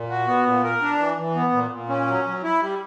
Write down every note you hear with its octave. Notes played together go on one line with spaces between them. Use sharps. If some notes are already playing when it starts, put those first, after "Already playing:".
Already playing: A#2
F#4
B3
A#2
A#4
D4
E3
E3
B3
A#2
A#2
C#4
F#3
F#3
E4
G3